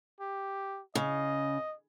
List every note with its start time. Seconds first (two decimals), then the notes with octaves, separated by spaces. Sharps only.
0.20 G4
0.95 C#3 D#5